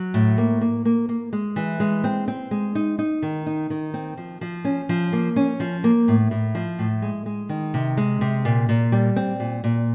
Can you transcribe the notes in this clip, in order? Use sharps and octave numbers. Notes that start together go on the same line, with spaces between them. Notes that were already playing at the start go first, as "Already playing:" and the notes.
Already playing: F#3
A2
A#3
A#3
A#3
A#3
G#3
E3
G#3
C4
C4
G#3
D#4
D#4
D#3
D#4
D#3
C4
F3
F3
C#4
F3
A#3
C#4
F3
A#3
A2
A2
F3
A2
G#3
G#3
D#3
C3
G#3
C3
A#2
A#2
G3
C4
A#2
A#2